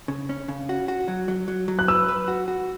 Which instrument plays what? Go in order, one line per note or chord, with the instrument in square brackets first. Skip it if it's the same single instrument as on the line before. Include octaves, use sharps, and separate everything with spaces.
[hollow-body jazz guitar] C#3
C#4
C#3
F#4
F#4
F#3
F#3
F#3
F#3
[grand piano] F#6
[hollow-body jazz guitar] B4 [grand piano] E6
[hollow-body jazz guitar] B4
F#4
F#4